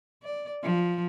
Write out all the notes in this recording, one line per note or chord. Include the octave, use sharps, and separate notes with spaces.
D5
F3